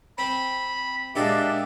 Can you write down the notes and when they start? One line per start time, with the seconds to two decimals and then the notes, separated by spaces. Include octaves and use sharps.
0.18 C4 B5
1.16 A#2 G#3 D4 G4 D5 E5